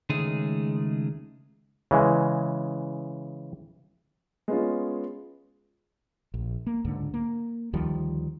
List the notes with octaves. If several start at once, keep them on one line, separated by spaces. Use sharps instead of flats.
C#2 D#3 G#3 A3 G#4
C#3 E3 G#3
G#3 B3 C#4 F4
A#1
A#3
C#2 G#2 D3
A#3
D2 D#3 F3 G3